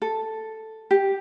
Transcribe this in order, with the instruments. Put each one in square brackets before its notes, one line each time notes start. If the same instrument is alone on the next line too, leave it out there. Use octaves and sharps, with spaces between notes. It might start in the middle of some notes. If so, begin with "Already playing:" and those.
[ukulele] A4
G4